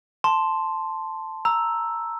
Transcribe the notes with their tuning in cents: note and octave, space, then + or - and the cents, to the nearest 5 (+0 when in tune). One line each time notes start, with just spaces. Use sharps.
A5 +0 C6 +0
A#5 -5 E6 +0